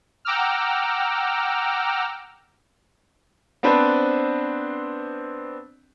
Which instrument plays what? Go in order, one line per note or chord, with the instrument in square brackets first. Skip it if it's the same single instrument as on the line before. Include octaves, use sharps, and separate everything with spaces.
[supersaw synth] F#5 G5 A#5 D6 E6 F6
[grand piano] B3 C4 D4 B4 C5